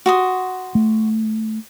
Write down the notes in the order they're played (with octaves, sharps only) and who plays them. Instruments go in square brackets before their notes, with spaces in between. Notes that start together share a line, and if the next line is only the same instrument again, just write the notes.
[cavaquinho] F#4 C6 D#6
[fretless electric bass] A3